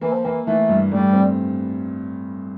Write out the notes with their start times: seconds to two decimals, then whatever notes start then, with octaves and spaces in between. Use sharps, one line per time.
0.01 E3 A#3
0.13 F3
0.25 E3 A#3
0.47 E3 A3
0.69 G2
0.91 A2 G3
1.13 C4